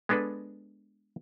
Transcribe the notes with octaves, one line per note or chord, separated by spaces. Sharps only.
G#3 B3 D4 A4 B4